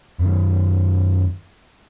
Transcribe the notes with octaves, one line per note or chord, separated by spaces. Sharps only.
F#2 D#3